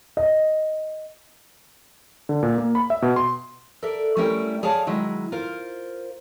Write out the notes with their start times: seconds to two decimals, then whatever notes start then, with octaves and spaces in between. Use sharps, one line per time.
0.17 D#5
2.29 D3
2.43 A#2
2.58 A#3
2.75 B5
2.90 E5
3.02 B2
3.16 C6
3.82 A4 A#4 D5 E5
4.16 G3 A3 C#4 E4 A#4 G5
4.63 G#4 C#5 D5 F5 A5
4.87 D#3 F#3 G#3 E4
5.32 F4 A#4 C5